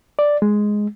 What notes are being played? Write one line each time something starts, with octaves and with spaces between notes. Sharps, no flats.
D5
G#3